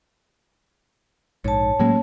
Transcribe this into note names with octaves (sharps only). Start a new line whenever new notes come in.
A#1 G#2 C#5 A5
A2 F#3 G#3 A#3 C#4